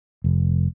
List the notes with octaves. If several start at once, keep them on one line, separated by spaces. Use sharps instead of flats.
F1